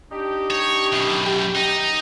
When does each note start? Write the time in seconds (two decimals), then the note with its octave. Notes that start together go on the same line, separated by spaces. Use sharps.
0.11 D4 D#4 G4
0.50 C#5
0.92 F#2 B2
1.25 G4
1.55 D#4 G4